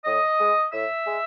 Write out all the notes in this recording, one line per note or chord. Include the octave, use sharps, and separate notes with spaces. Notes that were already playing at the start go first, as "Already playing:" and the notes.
A2 D#5
G#3
A2 E5
G#3